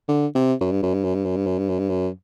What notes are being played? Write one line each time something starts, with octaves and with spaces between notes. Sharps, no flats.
D3
C3
F#2
G2
F#2
G2
F#2
G2
F#2
G2
F#2
G2
F#2
G2
F#2